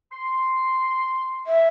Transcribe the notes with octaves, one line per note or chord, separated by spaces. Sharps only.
C6
E5